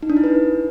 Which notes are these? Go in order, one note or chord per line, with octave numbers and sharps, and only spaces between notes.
D#4
D4
E4
B4